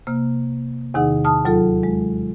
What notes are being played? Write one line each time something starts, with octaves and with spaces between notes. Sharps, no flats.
C3 A#3 F6
E2 C3 D#3 D#4 G#4 F#5
A5 D#6 F6
D#2 F#3 F4 A4
G#3